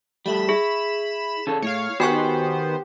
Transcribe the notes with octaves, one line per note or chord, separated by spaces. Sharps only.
G3 A3 B5 E7
E4 G#4
C#3 A4
A2 C#5 F5
D#3 B3 F#4 G4 C5 G#5 C#6